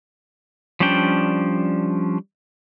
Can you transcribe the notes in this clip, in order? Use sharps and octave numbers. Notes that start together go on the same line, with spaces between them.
F3 G3 C#4 D4 G5